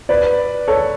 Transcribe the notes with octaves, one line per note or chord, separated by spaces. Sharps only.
B4 D5
A4 C#5